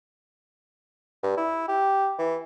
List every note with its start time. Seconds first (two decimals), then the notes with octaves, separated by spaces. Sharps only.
1.23 G2
1.37 E4
1.68 G4
2.19 E3